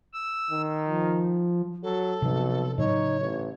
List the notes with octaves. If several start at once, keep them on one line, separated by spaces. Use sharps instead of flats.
E6
D#3
F3
F#3 A4
B1 C3 F3
A2 C#3 F#3 D#4 C#5
A1